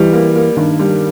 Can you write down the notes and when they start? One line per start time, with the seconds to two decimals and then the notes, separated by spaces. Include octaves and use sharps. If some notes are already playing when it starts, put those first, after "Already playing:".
Already playing: E3 G3
0.13 A#3
0.35 A#3
0.57 G2 D#3
0.79 G3